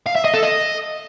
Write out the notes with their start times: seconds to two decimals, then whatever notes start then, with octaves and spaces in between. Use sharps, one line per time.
0.06 F5
0.16 E5
0.25 D#5
0.34 A4
0.43 D#5